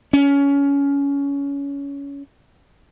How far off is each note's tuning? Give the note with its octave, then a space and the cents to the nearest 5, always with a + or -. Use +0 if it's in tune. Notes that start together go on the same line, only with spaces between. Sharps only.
C#4 +20